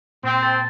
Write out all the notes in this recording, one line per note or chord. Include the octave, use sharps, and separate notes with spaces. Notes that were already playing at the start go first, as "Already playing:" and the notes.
A#2 C4
A4